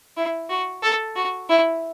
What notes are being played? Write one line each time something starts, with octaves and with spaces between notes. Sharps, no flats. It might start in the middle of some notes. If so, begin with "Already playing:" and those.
E4
F#4
A4
F#4
E4